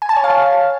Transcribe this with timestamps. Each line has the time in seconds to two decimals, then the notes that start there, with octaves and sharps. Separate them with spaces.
0.02 G#5
0.09 A5
0.16 C#5
0.24 F5